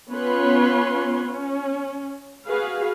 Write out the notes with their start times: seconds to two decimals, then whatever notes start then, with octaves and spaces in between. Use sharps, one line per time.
0.11 B3 C#4 F4 B4 C#5 C6
1.26 C#4
2.47 F#4 G#4 B4 F5